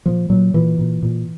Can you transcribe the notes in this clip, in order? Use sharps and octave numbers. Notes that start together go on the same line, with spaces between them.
A#2 F3
A#2 F#3
A#2 E3
A#2
A#2